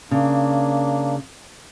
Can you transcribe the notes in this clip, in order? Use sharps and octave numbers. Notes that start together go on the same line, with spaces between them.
C#3 A#3 D4